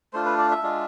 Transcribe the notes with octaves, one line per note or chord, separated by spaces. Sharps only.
A3 D4 F4 C5
B4
D5
E5
G#3 D4 F4